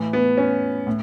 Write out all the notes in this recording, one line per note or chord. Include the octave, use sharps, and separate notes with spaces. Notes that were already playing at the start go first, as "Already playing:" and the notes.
Already playing: A2 E3
B3
C#4
A2